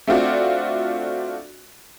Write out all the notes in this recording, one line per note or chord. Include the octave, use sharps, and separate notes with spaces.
A3 C4 D4 F4 F#4 D5